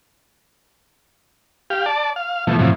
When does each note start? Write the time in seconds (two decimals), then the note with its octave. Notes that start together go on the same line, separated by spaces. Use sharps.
1.70 G4 F5
1.86 D5 A5
2.16 F5
2.47 B2 E3 F3 A3
2.59 F#2 A2 C3 E3 F3